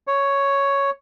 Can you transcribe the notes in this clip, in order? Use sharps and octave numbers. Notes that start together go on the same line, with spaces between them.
C#5